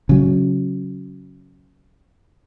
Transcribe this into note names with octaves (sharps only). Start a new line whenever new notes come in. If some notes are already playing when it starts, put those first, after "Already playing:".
C#3 F#3